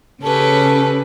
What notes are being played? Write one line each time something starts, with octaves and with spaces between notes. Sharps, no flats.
C#3 C#4 G4 A4 B4 A5